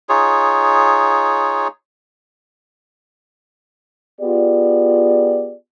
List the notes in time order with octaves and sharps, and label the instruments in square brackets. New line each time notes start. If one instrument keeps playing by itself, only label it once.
[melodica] D#4 F4 G#4 C#5
[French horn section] B3 F4 G4 G#4 D5